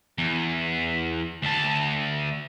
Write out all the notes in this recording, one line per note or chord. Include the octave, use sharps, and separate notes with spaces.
E2
D2 A5